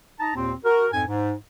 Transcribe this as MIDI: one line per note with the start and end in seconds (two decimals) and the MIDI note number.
0.20 0.33 63
0.20 0.33 81
0.20 0.33 82
0.35 0.53 39
0.35 0.53 46
0.35 0.53 60
0.65 0.87 66
0.65 0.87 70
0.92 1.03 41
0.92 1.03 44
0.92 1.03 80
1.08 1.34 44